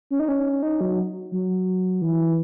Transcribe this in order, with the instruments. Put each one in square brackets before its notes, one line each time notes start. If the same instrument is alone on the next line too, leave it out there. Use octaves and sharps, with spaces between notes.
[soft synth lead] C#4
D#4
C#4
D#4
F#3
F#3
E3